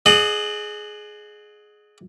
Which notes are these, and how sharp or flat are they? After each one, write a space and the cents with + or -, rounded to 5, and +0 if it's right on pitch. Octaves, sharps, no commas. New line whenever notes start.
G#4 +15 D#5 -40 F#5 +0